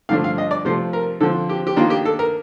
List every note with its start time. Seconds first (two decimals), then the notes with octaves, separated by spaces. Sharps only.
0.09 G2 D3 F3 A3 D4 F5
0.24 F5
0.38 D#5
0.51 D5
0.65 C3 F3 A3 C5
0.93 A#4
1.21 D3 F3 C4 A4
1.49 G4
1.67 G4
1.76 D#3 A#3 D4 F4
1.90 G4
2.05 A4
2.19 A#4